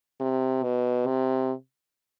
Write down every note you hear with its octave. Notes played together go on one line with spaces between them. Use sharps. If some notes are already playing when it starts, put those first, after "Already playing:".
C3
B2
C3